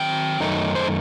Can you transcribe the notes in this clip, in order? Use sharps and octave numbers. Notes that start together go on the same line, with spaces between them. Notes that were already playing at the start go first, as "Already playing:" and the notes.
Already playing: D#3 F#3 C4 G5
F#2 D#3 A3 D#4
C5